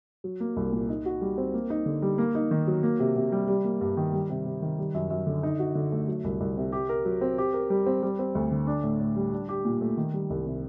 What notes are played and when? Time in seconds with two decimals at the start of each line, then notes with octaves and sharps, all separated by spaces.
0.24 F#3
0.40 A#3
0.56 C2
0.72 A#2
0.89 D#4
1.05 F#4
1.21 G3
1.38 C4
1.54 A#3
1.70 D#4
1.86 D3
2.02 G3
2.18 A#3
2.35 D#4
2.51 D#3
2.67 F#3
2.83 A#3
3.00 C3
3.16 C3
3.32 G3
3.48 G3
3.65 A#3
3.81 G2
3.97 D#3
4.13 G3
4.30 C3
4.46 C3
4.62 D#3
4.78 G3
4.94 F#2
5.10 F#2
5.27 D3
5.43 D#4
5.59 F#4
5.75 D3
5.92 A3
6.08 F#3
6.24 C2
6.40 C2
6.57 C3
6.72 G4
6.89 A#4
7.05 F#3
7.21 C4
7.38 G4
7.54 A#4
7.70 G3
7.86 C4
8.03 G3
8.19 C4
8.35 D2
8.51 D3
8.67 D4
8.83 A2
9.00 A2
9.16 G3
9.32 D4
9.49 G4
9.65 A#2
9.81 A3
9.97 D#3
10.13 G3
10.30 C2
10.46 C3